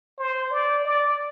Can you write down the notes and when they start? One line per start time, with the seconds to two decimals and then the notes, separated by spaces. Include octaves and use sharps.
0.18 C5
0.51 D5
0.85 D5